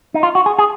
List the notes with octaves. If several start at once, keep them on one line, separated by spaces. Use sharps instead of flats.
D#4
F4
F#4
G#4
G#4